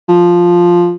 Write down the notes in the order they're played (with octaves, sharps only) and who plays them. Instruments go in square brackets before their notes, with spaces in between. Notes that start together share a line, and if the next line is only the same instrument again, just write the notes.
[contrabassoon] F3